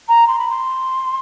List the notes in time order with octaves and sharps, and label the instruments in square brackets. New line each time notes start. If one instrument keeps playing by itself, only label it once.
[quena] A#5
C6
B5
C6